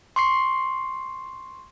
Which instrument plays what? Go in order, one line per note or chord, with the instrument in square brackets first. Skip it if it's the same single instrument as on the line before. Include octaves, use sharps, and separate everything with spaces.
[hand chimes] C6 C#6 C7